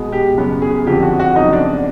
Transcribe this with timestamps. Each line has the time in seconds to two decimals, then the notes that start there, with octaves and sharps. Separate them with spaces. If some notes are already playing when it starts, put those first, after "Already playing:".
Already playing: B2 G#3 B3
0.12 G4
0.38 F#2 C#3 F#3 B3
0.62 G#4
0.86 F2 D3 F3 G4
1.03 F#4
1.20 F#4
1.35 F2 C#3 F#3 B3 D#4
1.53 D4